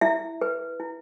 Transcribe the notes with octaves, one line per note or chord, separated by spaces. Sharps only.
E4 E5
B4
E4